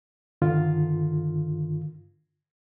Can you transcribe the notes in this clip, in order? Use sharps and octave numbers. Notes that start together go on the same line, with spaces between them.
G2 D3 D#3 F4